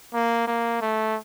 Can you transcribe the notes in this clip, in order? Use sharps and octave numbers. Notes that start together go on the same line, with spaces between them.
A#3
A#3
A3